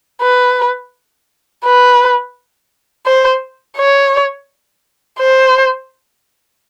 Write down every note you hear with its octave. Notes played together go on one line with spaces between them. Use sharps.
B4
B4
C5
C#5
C5